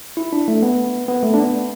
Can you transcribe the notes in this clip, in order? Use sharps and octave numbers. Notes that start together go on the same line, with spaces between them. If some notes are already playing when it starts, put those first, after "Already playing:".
E4
D4
A3
B3
B3
A3
D4
B3